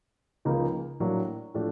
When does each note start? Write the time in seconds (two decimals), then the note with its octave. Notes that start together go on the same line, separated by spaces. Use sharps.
0.45 C#2 C#3 F3 A#3 D#4
1.00 A2 F#3 A#3 D4
1.54 A2 F3 A3 D4